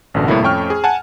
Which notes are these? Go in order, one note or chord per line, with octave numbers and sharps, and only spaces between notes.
A1 F#2 B2 D3
A2 C3 G3 A3 A#3 E4
F2 A3 C#4 G5 C#6 F6
G#4
F#5 G#5 A5